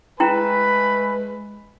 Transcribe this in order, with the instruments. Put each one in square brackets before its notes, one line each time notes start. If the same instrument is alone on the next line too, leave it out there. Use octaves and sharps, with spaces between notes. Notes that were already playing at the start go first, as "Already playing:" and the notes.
[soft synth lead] G#3 [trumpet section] A3 G#5 B5 [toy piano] E4 G5 A#5 [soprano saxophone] B4